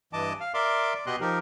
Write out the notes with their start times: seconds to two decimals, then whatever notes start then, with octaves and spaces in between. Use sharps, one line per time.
0.13 G2 E3 D#5 A5 D6
0.40 F5
0.54 A#4 D5 E5 C6 D6
0.95 D5
1.06 B2 B3 G4 D#5 C6 F#6
1.21 F3 D#4 G4 A#4